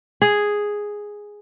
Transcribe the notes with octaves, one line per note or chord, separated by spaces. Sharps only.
G#4